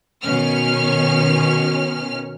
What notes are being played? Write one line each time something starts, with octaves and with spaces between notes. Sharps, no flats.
B2 D#3 C#4 F6